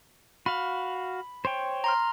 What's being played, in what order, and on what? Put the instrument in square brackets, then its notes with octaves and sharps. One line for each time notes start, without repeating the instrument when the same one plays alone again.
[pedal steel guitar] F#4 F5 [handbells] B5
[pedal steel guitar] C5 C#5 G5
[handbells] A#5 C6 F6